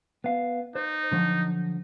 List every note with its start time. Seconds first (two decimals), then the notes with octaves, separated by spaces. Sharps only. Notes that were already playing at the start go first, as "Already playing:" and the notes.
0.24 B3 F5
0.75 D#4 C5
1.12 D3 F3 F#3